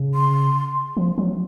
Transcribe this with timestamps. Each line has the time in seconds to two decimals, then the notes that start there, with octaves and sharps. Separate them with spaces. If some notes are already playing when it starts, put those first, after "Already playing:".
Already playing: C#3
0.14 C6
0.97 F3
1.18 F#3